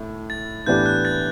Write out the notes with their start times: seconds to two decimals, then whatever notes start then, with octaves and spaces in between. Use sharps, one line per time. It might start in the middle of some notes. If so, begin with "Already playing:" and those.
Already playing: A2
0.30 A6
0.66 A2 E3 B3 D4 G4 G6
0.86 F#6
1.05 A6